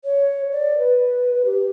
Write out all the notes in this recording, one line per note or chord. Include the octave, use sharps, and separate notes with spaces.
C#5
D5
B4
G4